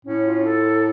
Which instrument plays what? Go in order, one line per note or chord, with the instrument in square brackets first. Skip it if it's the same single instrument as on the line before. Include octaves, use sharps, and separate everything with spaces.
[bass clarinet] A2 [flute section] C#4
[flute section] F4
A4
A#4